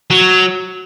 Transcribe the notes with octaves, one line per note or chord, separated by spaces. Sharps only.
F#3